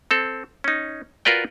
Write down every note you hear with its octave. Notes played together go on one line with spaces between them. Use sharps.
C4 A4
C#4 D#4
F4 F#4 A#4 B4 D5 G5